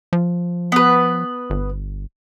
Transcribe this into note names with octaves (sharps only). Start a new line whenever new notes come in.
F3
B3 B4
G1